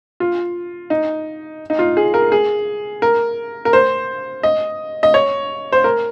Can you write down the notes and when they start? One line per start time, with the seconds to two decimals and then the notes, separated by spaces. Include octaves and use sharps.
0.20 F4
0.90 D#4
1.70 D#4
1.79 F4
1.97 G#4
2.14 A#4
2.32 G#4
3.02 A#4
3.65 A#4
3.73 C5
4.43 D#5
5.03 D#5
5.14 C#5
5.72 C5
5.84 A#4